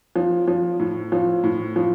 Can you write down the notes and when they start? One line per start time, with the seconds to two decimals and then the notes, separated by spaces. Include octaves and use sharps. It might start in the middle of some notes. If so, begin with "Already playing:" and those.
0.16 F3
0.48 F3
0.80 A2
1.12 F3
1.44 A2
1.76 F3